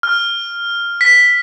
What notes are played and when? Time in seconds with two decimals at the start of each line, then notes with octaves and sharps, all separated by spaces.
0.03 F6
1.01 B6